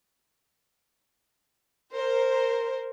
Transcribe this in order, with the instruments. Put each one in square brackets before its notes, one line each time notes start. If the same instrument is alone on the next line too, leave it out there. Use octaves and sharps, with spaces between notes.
[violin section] A#4 C5